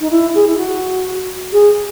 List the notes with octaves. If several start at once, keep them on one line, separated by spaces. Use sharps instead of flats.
D#4
E4
G#4
E4
F#4
G#4